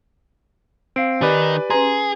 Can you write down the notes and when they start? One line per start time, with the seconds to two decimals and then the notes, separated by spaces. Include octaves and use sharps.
0.96 C4 F5 C7 D7
1.21 D#3 D#4 G4 B4 D5 G#5
1.70 C#4 G#4 B4 A#5 C6